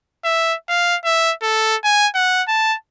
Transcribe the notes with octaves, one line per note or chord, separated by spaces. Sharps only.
E5
F5
E5
A4
G#5
F#5
A5